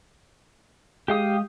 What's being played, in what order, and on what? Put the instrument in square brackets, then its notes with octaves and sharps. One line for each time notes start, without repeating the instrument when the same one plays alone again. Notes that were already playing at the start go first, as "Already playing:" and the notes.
[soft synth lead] G#3 [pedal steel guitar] G4 F5 D#6